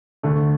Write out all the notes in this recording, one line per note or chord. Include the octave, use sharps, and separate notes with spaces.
D2 D3 A3 D4